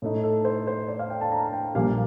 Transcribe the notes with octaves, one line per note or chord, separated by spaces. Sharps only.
A2 A3 D#4
A4
C5
C5
D5
F5
G5
A5
A#5
G5
A#1 A#2 G3 F5